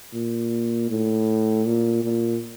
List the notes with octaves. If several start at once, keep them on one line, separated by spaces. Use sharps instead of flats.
A#2
A2
A#2
A#2